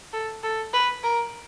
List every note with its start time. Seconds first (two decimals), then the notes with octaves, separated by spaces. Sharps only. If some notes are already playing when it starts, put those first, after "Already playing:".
0.13 A4
0.43 A4
0.74 B4
1.04 A#4